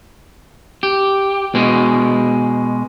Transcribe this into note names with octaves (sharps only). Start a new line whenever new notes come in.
G4
B2 G#3